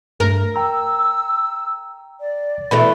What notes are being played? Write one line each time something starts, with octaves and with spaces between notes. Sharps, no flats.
G2 A3 A#4
G5 A#5 E6
D5
B2 E3 A3 B5